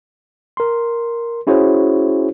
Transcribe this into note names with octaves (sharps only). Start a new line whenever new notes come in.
A#4 C6
C#4 E4 F#4 G#4 C5 C#5